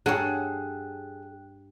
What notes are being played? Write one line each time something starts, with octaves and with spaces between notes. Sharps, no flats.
G2 G#4 A4 C#5 F#5 G5 F#6